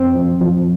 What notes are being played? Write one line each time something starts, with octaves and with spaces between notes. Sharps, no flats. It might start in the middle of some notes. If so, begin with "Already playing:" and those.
Already playing: F2 C4
F3
F3